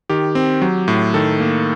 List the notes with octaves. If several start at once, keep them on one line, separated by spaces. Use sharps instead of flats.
D#3 G4
C4
F#3
A2
D#3 A4
A#3